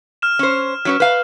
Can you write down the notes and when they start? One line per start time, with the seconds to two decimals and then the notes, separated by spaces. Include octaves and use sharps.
0.22 F6 E7
0.39 C#4 C5
0.85 F#3 C#4 B4
1.00 B4 F5